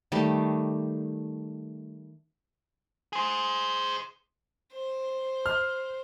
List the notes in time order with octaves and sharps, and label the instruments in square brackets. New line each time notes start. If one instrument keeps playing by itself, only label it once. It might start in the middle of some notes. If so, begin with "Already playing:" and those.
[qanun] D#3 G3 A3
[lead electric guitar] G#4 C5
[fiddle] C5
[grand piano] F6